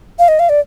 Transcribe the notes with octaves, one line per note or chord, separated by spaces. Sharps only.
F5
D#5
F5
D5